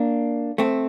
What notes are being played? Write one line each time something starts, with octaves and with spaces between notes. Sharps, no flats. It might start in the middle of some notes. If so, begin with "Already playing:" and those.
Already playing: A#3 D4
A3 C4